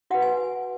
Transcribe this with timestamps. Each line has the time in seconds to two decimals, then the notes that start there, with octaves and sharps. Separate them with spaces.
0.10 F#4 B4 F#5
0.22 G#5